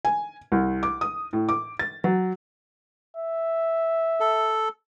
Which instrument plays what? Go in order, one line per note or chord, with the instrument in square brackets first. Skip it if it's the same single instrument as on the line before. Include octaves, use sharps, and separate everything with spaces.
[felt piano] G#5
C2
D6
D#6
A2
D6
A6
F#3
[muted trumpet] E5
[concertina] A4